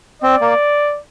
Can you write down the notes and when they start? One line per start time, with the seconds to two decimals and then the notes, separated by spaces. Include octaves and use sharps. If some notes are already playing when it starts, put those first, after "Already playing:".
0.22 C4 D5
0.41 A#3